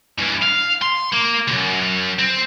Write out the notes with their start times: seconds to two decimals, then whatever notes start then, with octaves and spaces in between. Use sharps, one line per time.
0.18 G2 E3
0.42 F5
0.82 C6
1.13 A#3
1.48 C#2 F#2
2.19 C4